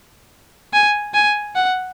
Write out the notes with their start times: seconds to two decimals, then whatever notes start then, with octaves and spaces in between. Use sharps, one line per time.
0.73 G#5
1.14 G#5
1.55 F#5